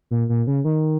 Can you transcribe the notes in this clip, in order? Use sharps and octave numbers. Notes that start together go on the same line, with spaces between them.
A#2
A#2
C#3
D#3